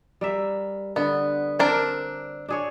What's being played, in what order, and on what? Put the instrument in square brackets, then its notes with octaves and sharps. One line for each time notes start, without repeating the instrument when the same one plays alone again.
[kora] G3 A#4 E5
[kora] D3 [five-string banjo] B3
[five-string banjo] C4 D4 A#4
[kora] D4 G#4 C#5